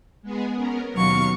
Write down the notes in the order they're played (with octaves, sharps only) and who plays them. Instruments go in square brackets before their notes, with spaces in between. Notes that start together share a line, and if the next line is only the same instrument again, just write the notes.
[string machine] G#3 B3 G#4
B3 C#4 A#4
[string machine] D#2 B2 F5 [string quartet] F#3 C#6